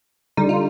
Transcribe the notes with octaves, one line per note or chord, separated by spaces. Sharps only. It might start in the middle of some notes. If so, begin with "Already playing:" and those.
D3 G3 D#4
F4